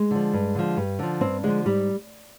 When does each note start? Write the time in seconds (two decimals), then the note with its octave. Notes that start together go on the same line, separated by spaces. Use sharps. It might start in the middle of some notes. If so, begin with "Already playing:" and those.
Already playing: G#3
0.11 D3 F3
0.33 G2
0.55 D3 F3
0.77 G2
0.99 D3 F3
1.21 G2 C4
1.43 D3 F3 G#3
1.65 G#2 G3